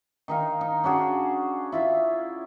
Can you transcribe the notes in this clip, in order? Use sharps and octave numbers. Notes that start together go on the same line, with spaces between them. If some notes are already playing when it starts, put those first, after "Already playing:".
D#3 D#4 F5
D#4
C#4 D4 F#4 G#4
E4 F4 E5